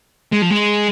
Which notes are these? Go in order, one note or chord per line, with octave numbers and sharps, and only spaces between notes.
G#3
F3
G#3